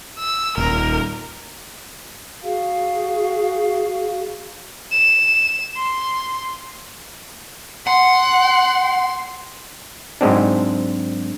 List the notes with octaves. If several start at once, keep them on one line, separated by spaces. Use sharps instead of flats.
E6
D#1 A#4
F#4 G#4 F5
E7
C6
F#5 C6
G#2 F#3 G#3 C4 D4